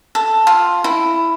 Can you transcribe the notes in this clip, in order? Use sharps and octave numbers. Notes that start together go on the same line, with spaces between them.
A4
F4
E4